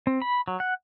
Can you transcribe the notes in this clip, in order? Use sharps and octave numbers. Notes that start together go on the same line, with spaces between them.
C4
B5
F#3
F#5